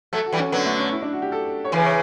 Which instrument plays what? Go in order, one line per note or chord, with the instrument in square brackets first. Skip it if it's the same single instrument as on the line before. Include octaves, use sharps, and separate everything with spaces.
[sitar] F#3 A3 [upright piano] A4
[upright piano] F#4
[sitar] E3 G3
[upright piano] C#4
[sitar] D3 F#3 [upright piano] B3
[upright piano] A3
C#4
E4
D4
F#4
G4
A4
C#5
[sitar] C#3 E3 [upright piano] B4
[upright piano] C#5